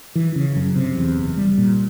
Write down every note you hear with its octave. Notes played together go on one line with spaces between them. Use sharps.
E3
C#3
F#2
C3
E2
F#1
G3
A#2